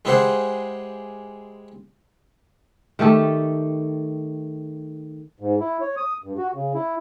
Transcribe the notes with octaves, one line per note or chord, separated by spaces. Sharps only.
G#3 E4 G4 G#4 C5 F#5
D#3 A3 G4 A4
G#2
E4
C#5
D#6
G2
F#4
C#3
E4